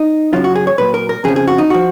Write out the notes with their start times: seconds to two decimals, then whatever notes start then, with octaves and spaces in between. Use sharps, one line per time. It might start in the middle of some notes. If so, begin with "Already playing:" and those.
Already playing: D#4
0.33 F#2 C#3 F#3 F4
0.44 F#4
0.55 G#4
0.67 C#5
0.78 A#2 F#3 B4
0.94 A#4
1.09 A#4
1.24 F2 C#3 F3 G#4
1.36 G#4
1.48 F#4
1.58 D#4
1.70 F3 F#4